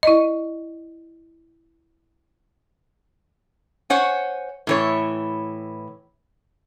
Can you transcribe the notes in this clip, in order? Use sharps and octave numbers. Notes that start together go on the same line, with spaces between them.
E4 D5 D#5
C5 C#5 F#5 G#5
A2 E3 C#5